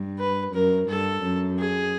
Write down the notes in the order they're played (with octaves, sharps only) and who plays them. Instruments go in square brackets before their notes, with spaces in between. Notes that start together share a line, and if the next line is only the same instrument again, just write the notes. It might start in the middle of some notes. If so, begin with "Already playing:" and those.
Already playing: [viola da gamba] G2
[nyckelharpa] B4
[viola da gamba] F#2 [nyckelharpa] A#4
[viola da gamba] G2 [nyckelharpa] A4
[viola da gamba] F#2
[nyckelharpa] G#4